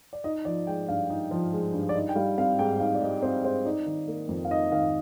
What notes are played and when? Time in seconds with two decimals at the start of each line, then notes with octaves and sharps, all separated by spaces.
0.13 D5
0.24 D#4 D#5
0.45 F3 D5
0.67 G#3 G5
0.88 G2 F5
1.10 D#4
1.31 F3
1.52 G#3
1.73 G2
1.89 D5
1.94 D#4 D#5
2.09 G5
2.16 G3 F5
2.38 C4 F5
2.59 G#2 G5
2.80 D#4 F5
2.95 D5
3.01 G3 D#5
3.22 C4 C5
3.44 G#2 C5
3.65 D#4 D5
3.86 D#3
4.08 A#3
4.29 F2
4.45 F5
4.51 D#4 D#5
4.72 D#3 F5